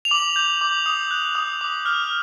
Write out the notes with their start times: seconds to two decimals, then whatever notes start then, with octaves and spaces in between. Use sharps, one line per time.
0.05 F7
0.11 D6 F#7
0.36 G6
0.61 D6
0.86 D#6
1.11 F#6
1.35 D#6
1.61 D6
1.86 F6